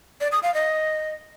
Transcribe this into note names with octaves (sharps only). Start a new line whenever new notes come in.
D5
D#6
F5
D#5